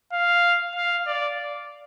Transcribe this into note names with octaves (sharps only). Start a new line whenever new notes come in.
F5
F5
D5